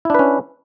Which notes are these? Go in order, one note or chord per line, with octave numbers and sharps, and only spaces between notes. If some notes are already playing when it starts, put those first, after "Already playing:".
C#4 D4 E4 B4